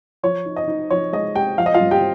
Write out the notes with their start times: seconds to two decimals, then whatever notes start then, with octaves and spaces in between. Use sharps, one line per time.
0.23 F3 C#5
0.46 D#4
0.56 D#5
0.68 D#4
0.90 F3 C#5
1.13 G#3 D#5
1.35 G#3 G4 G5
1.58 F3 F5
1.66 D#5
1.74 F4 F5
1.80 G2
1.91 G4 G5